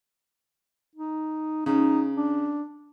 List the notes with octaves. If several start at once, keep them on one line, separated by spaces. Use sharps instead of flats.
D#4
C#3 D#4
D4